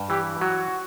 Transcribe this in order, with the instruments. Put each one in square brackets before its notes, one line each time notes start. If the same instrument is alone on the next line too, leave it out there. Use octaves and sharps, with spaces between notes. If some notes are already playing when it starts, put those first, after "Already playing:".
Already playing: [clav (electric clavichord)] G2
[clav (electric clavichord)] E3 [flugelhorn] G4
[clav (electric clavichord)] F#3 [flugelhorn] F#4